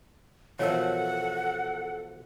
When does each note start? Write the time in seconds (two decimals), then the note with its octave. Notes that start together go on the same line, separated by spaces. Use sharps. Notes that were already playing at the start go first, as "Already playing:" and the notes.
0.59 B2 E3 F3 A4 A#4 C#5 F#5